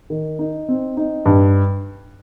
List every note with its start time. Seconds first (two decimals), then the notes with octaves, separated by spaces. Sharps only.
0.10 D#3
0.39 D#4
0.69 C4
0.97 D#4
1.26 G2